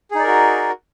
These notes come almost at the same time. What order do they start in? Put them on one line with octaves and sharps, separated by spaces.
G#4 D#4 D5 A#4 F#4